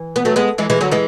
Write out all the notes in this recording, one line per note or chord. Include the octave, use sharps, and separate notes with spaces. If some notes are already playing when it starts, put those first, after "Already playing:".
Already playing: E3
B3
F#3 A3
G#3 B3
E3 G#3
E3 G#3
D3 F#3
E3 G#3